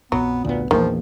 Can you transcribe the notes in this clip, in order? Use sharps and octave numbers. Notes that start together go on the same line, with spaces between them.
A#1 F2 F#3 B3
D2 A#2 B3
A#1 E2 D#3 F3 A#3 E4